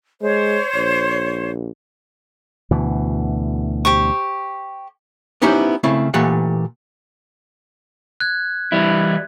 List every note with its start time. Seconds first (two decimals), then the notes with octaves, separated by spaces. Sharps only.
0.22 G#3 C5 C#5
0.75 A#1
2.71 D2 B2 E3
3.85 G4 C5 C#6
5.42 B3 C#4 D#4 E4 G4 C5
5.83 C#3 A3 C4 E4
6.14 A#2 E3 A3 G4 F#5
8.20 F#6 G#6
8.72 E3 G3 E4